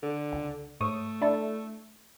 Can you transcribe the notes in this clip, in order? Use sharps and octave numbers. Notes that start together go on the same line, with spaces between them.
D3
C#2
G#2 A3 C#5 D#6
D4 E4 A4